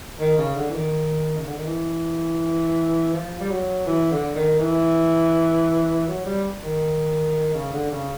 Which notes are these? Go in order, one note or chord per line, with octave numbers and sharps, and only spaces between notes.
D#3
C#3
D3
E3
D#3
C#3
D3
D#3
E3
F3
G3
F#3
E3
D3
D#3
E3
F#3
G3
D#3
C#3
D3
C#3